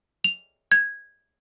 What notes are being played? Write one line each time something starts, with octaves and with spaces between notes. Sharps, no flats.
F7
G#6